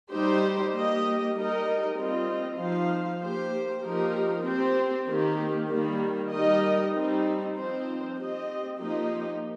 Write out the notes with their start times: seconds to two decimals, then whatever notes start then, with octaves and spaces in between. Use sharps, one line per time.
0.11 G3 D#4 G4 C5
0.73 A#3 G4 D#5
1.35 G3 D#4 A#4 D#5
1.97 G3 C4 F4 D#5
2.59 F3 D#4 C5 F5
3.21 A#3 G4 C5
3.83 F3 A#3 D#4 G4 A#4
4.45 C4 G4 C5
5.07 D#3 A#3 G4
5.69 D#3 G3 A#3
6.31 G3 D#4 A#4 D#5
6.93 G3 C4 D#4
7.56 F3 C4 D#4 C5
8.17 C4 G4 D#5
8.79 F3 A#3 D#4 G4 D#5